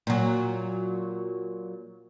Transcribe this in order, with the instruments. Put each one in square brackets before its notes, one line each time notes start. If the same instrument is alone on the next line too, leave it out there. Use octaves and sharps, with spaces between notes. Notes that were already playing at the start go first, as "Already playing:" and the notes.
[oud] A#2 F#3